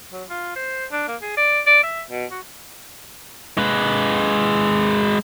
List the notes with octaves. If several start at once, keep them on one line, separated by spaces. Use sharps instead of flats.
F#3
F4
C5
D4
A#3
G#4
D5
D5
E5
B2
F#4
G#3 B4